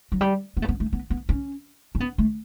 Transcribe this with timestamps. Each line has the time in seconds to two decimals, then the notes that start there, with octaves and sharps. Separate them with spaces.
0.12 F#3
0.21 G3
0.57 B3
0.62 A3
0.68 B3
0.80 A3
0.93 B3
1.10 B3
1.29 C#4
1.95 C#4
2.00 B3
2.18 A3